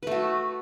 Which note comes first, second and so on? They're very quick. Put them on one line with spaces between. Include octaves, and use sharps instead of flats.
B4 A3 F#4